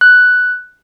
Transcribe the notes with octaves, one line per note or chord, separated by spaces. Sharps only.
F#6